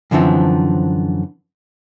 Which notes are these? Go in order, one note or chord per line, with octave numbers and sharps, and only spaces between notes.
F#2 D3 E3 F3 C4